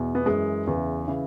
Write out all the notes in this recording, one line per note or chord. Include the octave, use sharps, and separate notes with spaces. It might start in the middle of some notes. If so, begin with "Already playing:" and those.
Already playing: E2 B2
B3
F#2 E3 G#3
E2 C#3 E3
C#3 E3